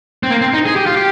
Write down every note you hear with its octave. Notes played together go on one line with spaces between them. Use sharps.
C4
A#3
C4
D#4
G#4
G4
F4
G4